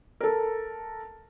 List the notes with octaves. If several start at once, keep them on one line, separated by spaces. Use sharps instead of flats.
A4 A#4